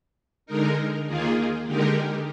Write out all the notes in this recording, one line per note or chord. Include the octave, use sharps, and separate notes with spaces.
D3 G#3 D#4 A#4
D#2 D#3 A#3 F4 G#4
D3 G#3 D#4 G4 A#4